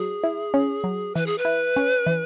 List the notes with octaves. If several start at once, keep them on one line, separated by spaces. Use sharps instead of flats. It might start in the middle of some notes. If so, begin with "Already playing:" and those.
Already playing: F#3 G#4
E4
C#4
F#3
E3 B4
G#4
B4
E4
C#4
E3